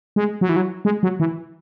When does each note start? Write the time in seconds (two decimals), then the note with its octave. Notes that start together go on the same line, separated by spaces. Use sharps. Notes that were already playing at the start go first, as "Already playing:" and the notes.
0.16 G#3
0.41 F#3
0.49 E3
0.56 F#3
0.85 G#3
1.03 F#3
1.20 E3